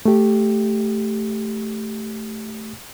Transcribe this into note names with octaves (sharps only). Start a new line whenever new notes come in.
A3 G4